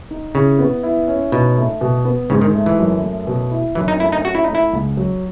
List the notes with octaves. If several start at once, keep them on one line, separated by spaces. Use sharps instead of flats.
D#4
C#3 E4
B3
E4
C#4
B2 D#4
A3
B2
B3
G#2 C#3
D#3
A3
E3
F#2
A3
B2
E4
F#2 E3
D#4
A3 E4
D#4
C#4 F#4
E4
A3 D#4
E4
C#2
F#3